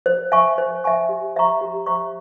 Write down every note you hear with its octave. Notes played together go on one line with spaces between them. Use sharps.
C5
E5 G#5 C#6
C5
E5 G#5 C#6
G4
C5 E5 A#5 C#6
G4
C5 E5 A#5 C#6